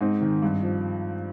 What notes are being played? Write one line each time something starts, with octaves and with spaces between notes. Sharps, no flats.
G#2 C4 D#4
D#3
G2
F3